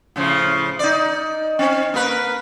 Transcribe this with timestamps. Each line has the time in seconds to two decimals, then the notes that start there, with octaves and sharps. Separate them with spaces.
0.16 A2 C#3 F3
0.79 D#4 D5
1.59 C4 C#4
1.94 A#3 A#4 B4